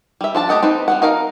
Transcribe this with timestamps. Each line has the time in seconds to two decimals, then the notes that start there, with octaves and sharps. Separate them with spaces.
0.21 G3 E5
0.35 F3 D4 A5
0.49 A3 G4 D#5 F#5
0.62 C4 D#4 B4
0.88 G3 B3 F#5
1.02 D#4 A#4 F5 A#5